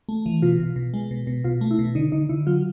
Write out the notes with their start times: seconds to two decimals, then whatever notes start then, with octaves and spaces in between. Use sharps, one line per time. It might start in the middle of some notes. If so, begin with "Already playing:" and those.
0.09 A3
0.26 E3
0.42 B2 F4
0.60 B2
0.76 B2
0.94 G#3
1.11 B2
1.27 B2
1.44 B2 F4
1.61 A3
1.71 E4
1.79 B2
1.95 D3 D#4
2.12 D3 D#4
2.29 D3 E4
2.47 F#3 F4